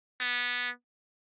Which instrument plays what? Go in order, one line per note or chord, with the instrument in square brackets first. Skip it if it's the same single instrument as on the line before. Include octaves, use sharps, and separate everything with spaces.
[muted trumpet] B3